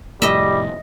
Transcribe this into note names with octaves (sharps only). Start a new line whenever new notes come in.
F1 A2 G3 D#5 E5